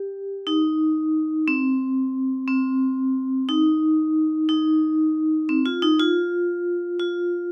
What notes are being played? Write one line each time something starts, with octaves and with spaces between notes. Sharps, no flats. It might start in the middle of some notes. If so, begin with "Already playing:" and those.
Already playing: G4
D#4
C4
C4
D#4
D#4
C4
F4
D#4
F4
F4